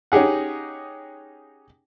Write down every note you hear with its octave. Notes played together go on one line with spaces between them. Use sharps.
C#4 D#4 G4 G#4 F#5